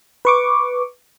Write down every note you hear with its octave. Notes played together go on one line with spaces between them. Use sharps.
B4 C#6 D6